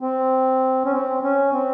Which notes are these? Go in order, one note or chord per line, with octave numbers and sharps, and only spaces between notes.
C4
C#4
C4
C#4
C4